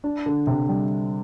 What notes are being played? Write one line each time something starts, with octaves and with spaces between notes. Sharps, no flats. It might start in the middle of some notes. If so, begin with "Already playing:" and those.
D4
D3
C3
G3